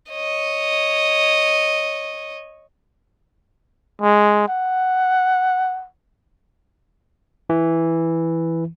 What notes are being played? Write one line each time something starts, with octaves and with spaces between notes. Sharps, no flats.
C#5 D#5
G#3
F#5
E3